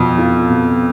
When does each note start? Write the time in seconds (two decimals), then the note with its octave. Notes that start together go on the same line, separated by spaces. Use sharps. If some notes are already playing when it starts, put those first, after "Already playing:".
Already playing: F2 B2 F3
0.18 F4
0.50 B2